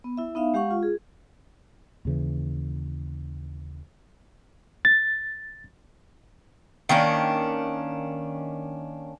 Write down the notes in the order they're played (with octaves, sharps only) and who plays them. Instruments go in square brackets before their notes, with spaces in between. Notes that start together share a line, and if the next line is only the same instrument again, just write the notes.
[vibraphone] B3
E4 E5
B3 D#4 E5 F5
G#3 G4 F5 F#5 C#6
F4
G#4
[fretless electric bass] D#2 C#3 E3
[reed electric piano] A6
[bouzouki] D#3 A#3 C#4 D4